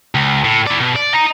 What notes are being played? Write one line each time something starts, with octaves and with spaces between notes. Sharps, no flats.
C#2
A2
E4 D5
B2
D5
D#5 A#5